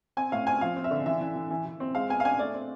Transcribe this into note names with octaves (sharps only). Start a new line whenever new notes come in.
C4 G#5
A2 F5
C4 G#5
F3 F5
C4
E5
D3
E3 E5
E3
E3
E3
E3
C4
G#3 F5
B3 G#5
F5
D4 G#5
A3 D5
C4